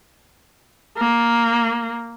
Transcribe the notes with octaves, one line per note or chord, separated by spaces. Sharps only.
A#3